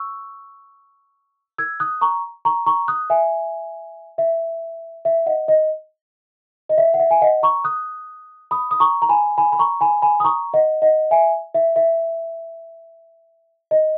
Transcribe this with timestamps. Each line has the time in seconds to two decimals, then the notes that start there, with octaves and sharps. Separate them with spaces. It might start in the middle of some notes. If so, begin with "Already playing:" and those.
Already playing: C#6 E6
1.58 E6 G#6
1.80 D#6 F#6
2.01 A#5 C#6
2.45 A#5 C#6
2.66 A#5 C#6
2.88 D#6 F#6
3.10 E5 G#5
4.18 E5
5.05 E5
5.26 D#5 F#5
5.48 D#5
6.69 D#5
6.78 E5
6.94 F#5
7.00 E5
7.11 G#5
7.21 D#5 F#5
7.43 A#5 C#6
7.64 D#6 F#6
8.51 B5 D#6
8.71 D#6
8.80 A#5 C#6
9.02 A#5
9.09 G#5 B5
9.38 G#5 B5
9.52 B5
9.59 A#5 C#6
9.81 G#5 B5
10.02 G#5 B5
10.20 D#6
10.24 A#5 C#6
10.53 D#5 F#5
10.82 D#5 F#5
11.11 E5 G#5
11.55 E5
11.76 E5
13.71 D#5